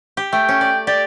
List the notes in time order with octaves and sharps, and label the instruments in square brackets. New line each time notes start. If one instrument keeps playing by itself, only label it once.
[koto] G4
[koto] A3 [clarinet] G5
[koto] C#4
D5
[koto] G4 [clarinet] D5